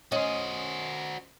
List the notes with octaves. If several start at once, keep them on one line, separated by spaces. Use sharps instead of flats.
C#4 F#4 C5 D#5